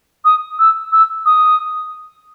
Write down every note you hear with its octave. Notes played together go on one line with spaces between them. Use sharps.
D#6
E6
E6
D#6